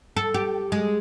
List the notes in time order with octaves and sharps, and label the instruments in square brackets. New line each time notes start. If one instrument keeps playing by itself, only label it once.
[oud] A4
G4
G#3